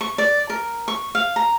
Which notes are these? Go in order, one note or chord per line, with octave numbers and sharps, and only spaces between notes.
C#6
D5
A#4
C#6
F5
A#5